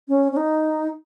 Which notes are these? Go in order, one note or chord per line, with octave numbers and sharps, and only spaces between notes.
C#4
C#4
D#4